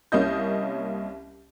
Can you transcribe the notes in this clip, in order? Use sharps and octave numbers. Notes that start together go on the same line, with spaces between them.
C2 A#3 C#4 D#5 G6